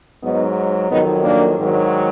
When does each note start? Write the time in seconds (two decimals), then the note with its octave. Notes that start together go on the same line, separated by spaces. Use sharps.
0.22 G#2 F#3 B3 D#4
0.89 F2 D#3 F#3 B3 D#4
1.23 A#3 D4
1.57 G#2 D#3 F#3